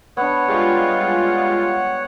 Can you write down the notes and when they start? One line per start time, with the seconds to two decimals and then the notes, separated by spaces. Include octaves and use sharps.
0.17 B3 D4 C#5 F#5
0.48 G3 G#3 F4 G4 C#6